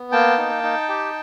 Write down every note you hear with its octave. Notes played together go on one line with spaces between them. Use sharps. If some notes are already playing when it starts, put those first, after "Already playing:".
Already playing: B3
A#3 G5 A5
D#4
D#4
G4